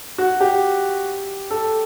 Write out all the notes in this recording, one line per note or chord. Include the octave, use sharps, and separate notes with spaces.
F#4
G4
A4